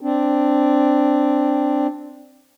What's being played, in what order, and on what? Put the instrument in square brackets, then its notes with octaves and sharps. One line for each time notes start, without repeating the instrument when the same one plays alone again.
[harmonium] C4 D4